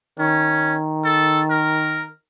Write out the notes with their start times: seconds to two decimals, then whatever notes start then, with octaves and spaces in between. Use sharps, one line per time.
0.19 D#3 C#4
1.04 A4
1.50 A#4